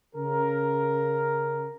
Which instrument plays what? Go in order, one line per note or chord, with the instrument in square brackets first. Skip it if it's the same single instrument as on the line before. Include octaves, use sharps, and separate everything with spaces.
[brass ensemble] C#3 A#4